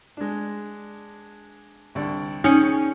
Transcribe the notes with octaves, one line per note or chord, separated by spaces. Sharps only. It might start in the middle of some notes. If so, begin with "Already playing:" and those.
G#3 D4
C2 D3 D5
C#4 D#4 G#4 C#7